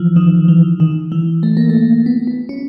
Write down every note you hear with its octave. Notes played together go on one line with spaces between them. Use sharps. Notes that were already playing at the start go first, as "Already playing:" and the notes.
Already playing: E3 F3
D#3
E3
D#3
E3
A3
A#3
A3
B3
B3
C#4